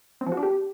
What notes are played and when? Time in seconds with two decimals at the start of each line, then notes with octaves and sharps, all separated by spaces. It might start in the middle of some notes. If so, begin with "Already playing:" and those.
0.21 C4
0.26 F3
0.32 F#4
0.37 D4
0.43 G4